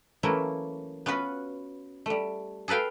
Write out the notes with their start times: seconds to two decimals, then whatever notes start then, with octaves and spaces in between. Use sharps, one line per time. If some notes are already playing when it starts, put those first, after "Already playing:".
0.23 E3 F#3 A3 A#3 C#4 E4
1.06 B3 C#4 F4 F#4 B4
2.06 G3 A3
2.68 G#4 A4 B4 F5 G5